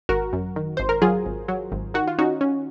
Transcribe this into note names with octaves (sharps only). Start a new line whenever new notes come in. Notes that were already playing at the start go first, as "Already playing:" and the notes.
G#1 F#4 A#4
F#2
D#3
G#1 C5
A#4
F#3 F4 G#4
G#1
F#3
G#1
D#3 F#4
F4
C#4 D#4 F#4
C#4